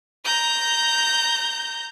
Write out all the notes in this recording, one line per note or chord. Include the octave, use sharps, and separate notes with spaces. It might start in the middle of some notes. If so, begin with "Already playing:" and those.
A#5 G6